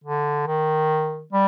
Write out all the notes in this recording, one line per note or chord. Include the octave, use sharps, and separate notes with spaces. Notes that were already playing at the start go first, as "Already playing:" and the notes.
D3
D#3
G3